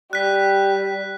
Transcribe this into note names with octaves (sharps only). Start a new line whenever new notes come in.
G3 F#6 B6